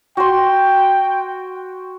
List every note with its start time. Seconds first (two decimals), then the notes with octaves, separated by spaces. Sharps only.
0.17 F#4 G5 C6